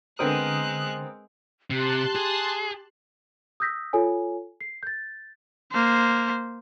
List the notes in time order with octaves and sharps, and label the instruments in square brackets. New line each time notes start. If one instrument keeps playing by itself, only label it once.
[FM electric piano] D3 D#6 [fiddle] G#3 F#6 [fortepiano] B3 C4 A#4
[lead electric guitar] C3 [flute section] G4 [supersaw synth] A5 C6 F#6
[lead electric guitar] G#4
[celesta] D#6 E6 G6 A#6 B6
F4 A4 C#5 G#5
C7
G6 A6
[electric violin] A#3 C5